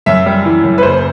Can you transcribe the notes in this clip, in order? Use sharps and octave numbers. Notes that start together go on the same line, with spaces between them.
F#2 E5
G3
E3
F#2
B4
F#1 C5